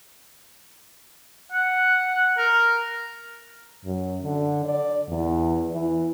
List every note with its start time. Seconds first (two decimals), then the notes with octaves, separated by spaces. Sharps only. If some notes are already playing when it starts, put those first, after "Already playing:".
1.52 F#5
2.37 A#4
3.85 F#2
4.23 D3
4.65 D5
5.08 E2
5.71 E3